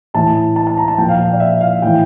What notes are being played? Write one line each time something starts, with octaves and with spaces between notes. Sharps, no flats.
A2 E3 A5
A5
A5
A#5
A5
A#2 F3 G5
F5
G5
D5
E5
F5
A2 E3 G5